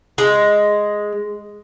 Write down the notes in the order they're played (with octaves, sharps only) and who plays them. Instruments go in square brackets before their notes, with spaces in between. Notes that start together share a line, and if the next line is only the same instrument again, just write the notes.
[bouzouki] G#3